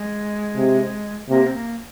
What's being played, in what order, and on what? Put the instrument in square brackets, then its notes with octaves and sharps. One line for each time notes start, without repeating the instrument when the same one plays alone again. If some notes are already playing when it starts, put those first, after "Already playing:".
Already playing: [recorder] G#3
[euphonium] C3
[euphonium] C3 [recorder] A#3
[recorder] C4
A#3